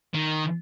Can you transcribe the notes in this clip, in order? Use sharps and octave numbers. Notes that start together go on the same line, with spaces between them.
D#3